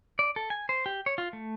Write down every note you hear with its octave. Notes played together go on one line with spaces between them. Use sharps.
D5
A4
G#5
C5
G4
C#5
F4
A3